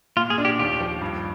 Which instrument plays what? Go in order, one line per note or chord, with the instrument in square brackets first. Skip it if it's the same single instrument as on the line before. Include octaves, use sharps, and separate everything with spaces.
[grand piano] A#2 [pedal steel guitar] F4
[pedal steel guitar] G#4
[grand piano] D4
[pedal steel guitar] G4
[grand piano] D#2 [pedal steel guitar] G4
[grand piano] F3
G2